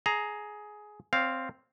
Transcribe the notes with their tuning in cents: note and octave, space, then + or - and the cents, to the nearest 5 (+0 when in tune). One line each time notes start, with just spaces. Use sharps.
G#4 +15 A#5 +0
C4 +0 C#5 +30 F5 +0